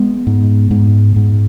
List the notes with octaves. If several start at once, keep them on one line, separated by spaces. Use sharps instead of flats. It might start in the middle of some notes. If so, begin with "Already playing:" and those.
Already playing: G#3 B3
G#2
G#2
G#2